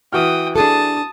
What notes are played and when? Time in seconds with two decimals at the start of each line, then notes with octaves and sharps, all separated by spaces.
0.13 E3 F#4 G5 D#6 F6
0.56 D4 G#4 A4 A5 D#6